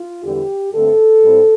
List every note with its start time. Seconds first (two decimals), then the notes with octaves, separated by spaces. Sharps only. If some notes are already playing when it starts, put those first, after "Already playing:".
Already playing: F4
0.24 E2 D3 G3 G4
0.72 G2 D3 A3 C4 A4
1.22 A2 G3 C4